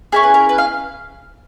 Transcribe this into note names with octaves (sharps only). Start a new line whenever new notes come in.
C#4 E4 G#4 A#4
B4
A#4
B4
F5